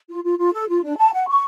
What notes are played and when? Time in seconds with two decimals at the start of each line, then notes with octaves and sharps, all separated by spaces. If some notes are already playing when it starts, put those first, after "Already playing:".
0.09 F4
0.23 F4
0.38 F4
0.53 A4
0.68 F4
0.82 D4
0.98 A5
1.12 F#5
1.28 C#6